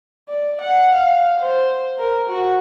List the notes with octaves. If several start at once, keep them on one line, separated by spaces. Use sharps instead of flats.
D5
F#5
F5
C5
A#4
F#4